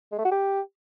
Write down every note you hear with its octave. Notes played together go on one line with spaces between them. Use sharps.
G#3
A3
F#4
G4